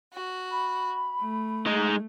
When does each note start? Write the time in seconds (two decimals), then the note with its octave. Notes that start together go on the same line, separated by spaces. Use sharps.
0.14 F#4
0.51 B5
1.19 A3
1.67 G#3 D#4